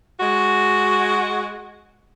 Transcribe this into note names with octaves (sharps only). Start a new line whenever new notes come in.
G#3 F#4